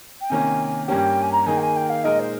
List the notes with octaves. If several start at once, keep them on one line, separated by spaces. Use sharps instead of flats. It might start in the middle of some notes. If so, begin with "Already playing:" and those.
G5
C3 D#3 A#3 C#4 G#5
G2 G3 A#3 C#4 G4 G5
G#5
A#5
D#3 A#3 D#4 G#4 G#5
G5
G#5
G5
F5
A#2 G#3 D#4 A#4 D#5
C5